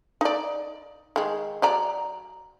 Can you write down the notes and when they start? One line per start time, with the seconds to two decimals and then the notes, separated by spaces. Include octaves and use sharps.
0.21 D#4 D5
1.16 D#3 G#3
1.62 F#3 D5 A#5